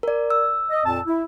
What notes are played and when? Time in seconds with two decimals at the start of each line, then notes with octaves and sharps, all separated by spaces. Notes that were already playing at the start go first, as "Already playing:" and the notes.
0.03 A#4 D5
0.30 E6
0.70 D#5
0.86 F2 A#2 A5
1.07 E4